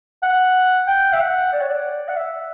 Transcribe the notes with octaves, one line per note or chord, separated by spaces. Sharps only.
F#5
G5
E5
F#5
D5
C#5
D5
F#5
E5